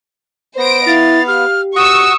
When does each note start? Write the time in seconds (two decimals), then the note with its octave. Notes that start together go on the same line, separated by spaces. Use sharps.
0.58 B3 C5 A#6 D7
0.87 E4 F5 A6
1.28 G4 F6
1.76 F#4 F#5 C#6 D#6 E6